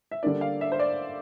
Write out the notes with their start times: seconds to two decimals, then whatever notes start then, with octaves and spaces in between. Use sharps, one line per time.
0.11 E5
0.23 D3 G3 A#3 D4 D5
0.41 F5
0.61 E5
0.72 C5
0.80 D5